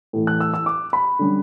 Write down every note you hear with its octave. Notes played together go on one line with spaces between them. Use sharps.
A2 E3 A3
F#6
E6
E6
D6
B5
D3 G3 C#4